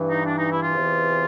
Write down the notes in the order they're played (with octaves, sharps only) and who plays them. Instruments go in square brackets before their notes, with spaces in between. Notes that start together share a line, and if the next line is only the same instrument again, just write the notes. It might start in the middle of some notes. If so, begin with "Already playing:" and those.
Already playing: [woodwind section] G2 E3
D#4
D4
D#4
E4
F4
E2 C3 E3